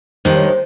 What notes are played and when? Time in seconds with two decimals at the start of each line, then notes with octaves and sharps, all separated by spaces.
0.25 G2 D#3 G#3 C5
0.36 C#5
0.47 C5